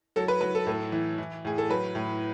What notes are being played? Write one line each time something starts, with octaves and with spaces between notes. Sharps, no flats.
F#3 A4
B4
F#3 B4
A4
A2 A4
E3
E3
A2 G#4
A4
F#3 B4
A2